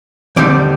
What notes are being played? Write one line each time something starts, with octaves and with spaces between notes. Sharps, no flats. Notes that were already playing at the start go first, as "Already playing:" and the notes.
D#2 D3 G3 C4 D#4 D5